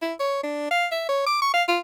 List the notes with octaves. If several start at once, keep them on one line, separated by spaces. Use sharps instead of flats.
E4
C#5
D4
F5
E5
C#5
D6
C#6
F5
F4